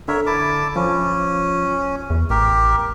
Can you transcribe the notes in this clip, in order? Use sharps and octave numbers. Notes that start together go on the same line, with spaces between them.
D3 A#4 C#5 E5
E4 A5 D6
F3 C#4
E2
A1 G4 A#4